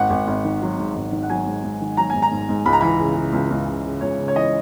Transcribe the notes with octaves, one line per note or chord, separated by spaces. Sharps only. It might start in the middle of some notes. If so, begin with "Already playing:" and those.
Already playing: G#1 F#5
G#1
G#1
D#3
F#3
G#2
G#1
D#3
F#5
F#3 G#5
G#2
G#2
D#3
F#3 A#5
G#2 G#5
A#5
G#2
G#2
C#2 B5
A#5
E3 B5
C#3
C#3
C#2
C#2
C#3
C#3
C#2 C#5
C#3
C#5
E3 D#5